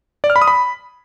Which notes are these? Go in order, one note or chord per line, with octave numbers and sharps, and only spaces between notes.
D5
F6
B5
D#6
B5